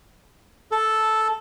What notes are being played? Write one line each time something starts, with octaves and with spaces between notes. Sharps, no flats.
A4